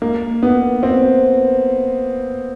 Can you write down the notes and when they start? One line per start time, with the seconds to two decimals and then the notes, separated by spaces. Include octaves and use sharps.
0.02 A#3
0.43 B3
0.83 C4